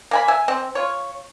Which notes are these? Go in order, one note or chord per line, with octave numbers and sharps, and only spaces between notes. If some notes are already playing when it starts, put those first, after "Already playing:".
A#3 G#5 B5
E5 G#5
C4
F4 C#5